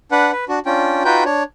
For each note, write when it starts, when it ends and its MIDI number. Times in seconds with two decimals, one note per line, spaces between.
0.12 0.32 62
0.12 0.32 71
0.12 0.32 78
0.32 0.45 71
0.48 0.59 62
0.48 0.59 66
0.66 1.03 61
0.66 1.03 62
0.66 1.03 65
0.66 1.03 79
1.05 1.24 63
1.05 1.24 65
1.05 1.24 66
1.05 1.24 71
1.05 1.24 79
1.05 1.24 91
1.25 1.43 62
1.25 1.43 73